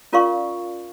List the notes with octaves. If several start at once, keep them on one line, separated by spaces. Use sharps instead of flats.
C#4 F4 A#4 D5 F5 C#6